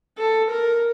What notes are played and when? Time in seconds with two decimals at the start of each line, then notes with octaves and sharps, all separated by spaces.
0.18 A4
0.51 A#4